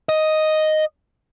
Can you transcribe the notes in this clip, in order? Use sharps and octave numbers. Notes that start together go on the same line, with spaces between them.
D#5